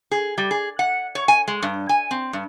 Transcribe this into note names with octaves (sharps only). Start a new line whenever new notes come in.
G#4
G3
G#4
F#5
C#5
G#5
G#3
G2
G#5
C4
G2